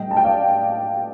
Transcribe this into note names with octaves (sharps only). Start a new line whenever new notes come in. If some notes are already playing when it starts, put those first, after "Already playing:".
Already playing: A2 G3 D#5 G5
A5
G5
D5 F5